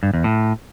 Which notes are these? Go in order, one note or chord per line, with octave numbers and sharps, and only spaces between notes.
G2
E2
A2